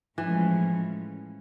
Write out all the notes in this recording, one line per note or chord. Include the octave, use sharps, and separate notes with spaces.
A2 E3 F3 G#3 C#4